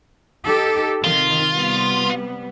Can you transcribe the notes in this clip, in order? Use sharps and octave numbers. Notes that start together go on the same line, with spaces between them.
D#4 G4 A4
C3 D#3 F4
C3 G3 B3